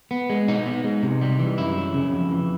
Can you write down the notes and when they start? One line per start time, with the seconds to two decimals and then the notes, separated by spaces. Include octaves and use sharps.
0.11 B3
0.29 G#3
0.48 B2 D#4
0.66 B3
0.84 G#3
1.03 C3
1.22 G3
1.39 E3
1.58 F#2 E4
1.77 F#3
1.94 C#3
2.12 F2
2.31 E3